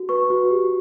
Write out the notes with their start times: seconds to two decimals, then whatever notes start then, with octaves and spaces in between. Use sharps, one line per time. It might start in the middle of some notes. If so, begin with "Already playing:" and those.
Already playing: F#4
0.09 B4 C#6
0.30 F#4
0.51 G4